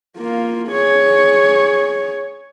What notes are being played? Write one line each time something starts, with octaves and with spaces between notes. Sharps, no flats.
A#3 F4
G#4 C#5